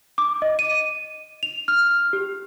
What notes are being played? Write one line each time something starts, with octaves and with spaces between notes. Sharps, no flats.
D6
D#5
D#7
F7
F6
G4